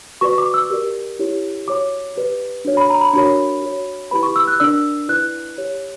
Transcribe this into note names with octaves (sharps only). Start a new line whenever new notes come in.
F#4 B4 D5 C#6
D6
E6
G4 A#4 D5
E4 G4 C#5
F#4 C#5 D6
G4 B4 D5
D4 F#4 C#5
B5
A#5
B5
D4 F#4 A#4 C#5 B5
F#4 C#5
E4 G4 B4 B5
C#6
E6
F#6
D4 A#4 D5 E6
E4 B4 D5 F#6
G4 C#5